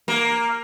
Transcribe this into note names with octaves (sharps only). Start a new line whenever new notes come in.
A#3